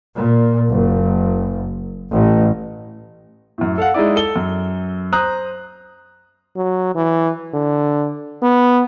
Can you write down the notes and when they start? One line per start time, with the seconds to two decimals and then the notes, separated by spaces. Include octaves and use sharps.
0.14 A#2
0.68 F#1
2.11 A1
3.58 F#2 A2
3.78 A4 F5 F#5
3.94 G#3 D#4 E4 D5
4.16 A4 G7
4.36 F#2
5.12 C5 A#5 D#6 F#6
6.56 F#3
6.95 E3
7.54 D3
8.42 B3